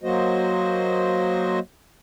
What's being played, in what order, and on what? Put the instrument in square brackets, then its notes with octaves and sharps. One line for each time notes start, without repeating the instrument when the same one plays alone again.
[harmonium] F#3 A#3 F#4 C5 D#5